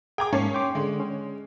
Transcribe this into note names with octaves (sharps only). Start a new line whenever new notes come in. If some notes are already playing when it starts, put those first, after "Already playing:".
G#4 G5 A#5 D6 G#6
G#2 A#3 C#4 A5 C7
G5 C6 D6
D3 G#3
C#4